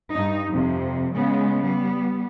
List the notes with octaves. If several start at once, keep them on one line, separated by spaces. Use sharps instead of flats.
G2 D#4
F2 C3
C#3 G#3 B3
G3 B3